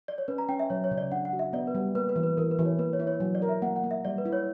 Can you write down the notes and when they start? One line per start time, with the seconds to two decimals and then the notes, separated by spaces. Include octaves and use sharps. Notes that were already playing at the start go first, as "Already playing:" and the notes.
0.08 D5
0.18 C#5
0.28 C#4 B4
0.38 A#5
0.49 C#4 G5
0.59 E5
0.70 F#3 C#5
0.84 C#5
0.91 C#3
0.98 D5
1.12 D4 F#5
1.25 F#5
1.33 F#4
1.39 E5
1.53 B3 D5
1.67 B4
1.75 G3
1.95 A#3 B4
2.09 B4
2.16 E3
2.23 B4
2.37 E3 A#4
2.51 B4
2.59 E3
2.65 C#5
2.79 A#3 B4
2.93 C#5
2.99 E4
3.07 C#5
3.20 F#3
3.35 D5
3.42 A#4
3.49 E5
3.62 A#3 F#5
3.76 F#5
3.84 A#3
3.91 E5
4.05 G3 D5
4.18 B4
4.25 E4
4.33 C#5